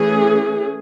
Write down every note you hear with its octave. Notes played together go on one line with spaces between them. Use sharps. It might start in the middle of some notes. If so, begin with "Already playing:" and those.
Already playing: E3 A3 C#4 G#4